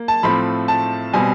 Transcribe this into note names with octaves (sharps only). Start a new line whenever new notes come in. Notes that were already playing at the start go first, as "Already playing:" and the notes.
Already playing: A#3
A5
A2 F3 A3 C4 B5
A5
B2 G3 C4 G#5